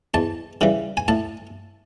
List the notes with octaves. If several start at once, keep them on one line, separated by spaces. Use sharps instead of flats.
E2 A5
C#3 E3 G3
G#5
A2 A5